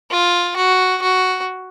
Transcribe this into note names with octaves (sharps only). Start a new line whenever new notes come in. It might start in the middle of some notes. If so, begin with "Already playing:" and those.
F4
F#4
F#4